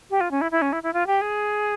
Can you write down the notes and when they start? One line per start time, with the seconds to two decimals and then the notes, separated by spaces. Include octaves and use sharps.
0.10 G4
0.20 F4
0.31 C#4
0.41 E4
0.51 E4
0.62 C#4
0.72 E4
0.83 E4
0.93 F4
1.07 G4
1.21 G#4